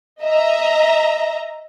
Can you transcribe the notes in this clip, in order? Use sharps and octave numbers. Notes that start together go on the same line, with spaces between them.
D#5 E5 A#5